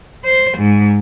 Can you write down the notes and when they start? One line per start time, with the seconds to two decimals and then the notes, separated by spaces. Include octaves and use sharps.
0.24 C5
0.57 G#2